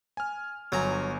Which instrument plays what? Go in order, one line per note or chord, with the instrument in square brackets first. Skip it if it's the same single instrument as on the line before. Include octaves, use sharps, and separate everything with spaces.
[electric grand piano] G#5 F6
[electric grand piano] G1 G#5 [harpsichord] F#3 A#5